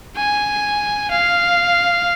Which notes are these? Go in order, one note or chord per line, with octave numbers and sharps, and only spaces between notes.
G#5
F5